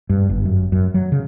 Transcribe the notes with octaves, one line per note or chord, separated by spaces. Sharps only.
G2
G1
F#2
F#2
F#3
C#3